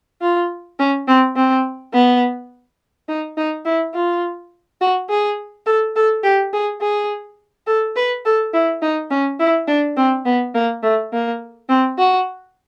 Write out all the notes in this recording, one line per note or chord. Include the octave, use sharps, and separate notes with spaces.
F4
C#4
C4
C4
B3
D#4
D#4
E4
F4
F#4
G#4
A4
A4
G4
G#4
G#4
A4
B4
A4
E4
D#4
C#4
E4
D4
C4
B3
A#3
A3
A#3
C4
F#4